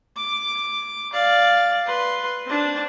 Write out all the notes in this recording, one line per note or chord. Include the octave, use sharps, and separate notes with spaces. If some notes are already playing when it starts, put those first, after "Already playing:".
D6
D5 F5
B4 C6
C4 D4